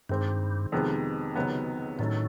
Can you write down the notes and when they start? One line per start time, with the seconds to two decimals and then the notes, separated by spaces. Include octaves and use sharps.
0.09 G2 D#3 G#3 C4
0.72 F2 C3 D#3 G#3 B3
1.36 C#2 C3 D#3 F#3 B3
1.99 A2 D#3 F#3 A3 C#4